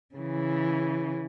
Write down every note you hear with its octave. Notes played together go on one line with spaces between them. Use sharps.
C#3 E3